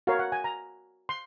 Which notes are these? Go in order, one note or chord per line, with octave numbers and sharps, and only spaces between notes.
F#4 A#4 C#5 F5
F#5
G#5
A#5
C6